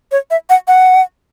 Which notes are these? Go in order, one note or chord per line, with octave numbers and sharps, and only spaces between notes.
C#5
E5
F#5
F#5